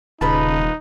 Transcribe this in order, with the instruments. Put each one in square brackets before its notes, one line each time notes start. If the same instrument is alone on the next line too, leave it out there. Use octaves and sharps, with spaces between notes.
[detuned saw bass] D#1 [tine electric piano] C#3 A5 [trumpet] D#4 [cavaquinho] F4 B4 B5